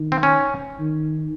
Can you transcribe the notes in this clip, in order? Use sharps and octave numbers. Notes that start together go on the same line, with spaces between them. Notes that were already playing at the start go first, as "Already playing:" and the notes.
Already playing: D#3
C4
C#4
D#3